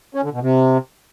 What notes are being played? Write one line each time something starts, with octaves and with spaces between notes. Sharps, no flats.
C#4
D3
B2
C3